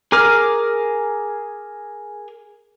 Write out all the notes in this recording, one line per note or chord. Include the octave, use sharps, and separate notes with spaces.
G#4 A#4 D6 F6